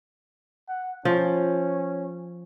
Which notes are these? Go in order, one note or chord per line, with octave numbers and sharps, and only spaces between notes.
F#5
F3 C#4